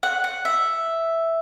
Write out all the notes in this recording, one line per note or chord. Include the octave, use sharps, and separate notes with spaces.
F#5
F#5
E5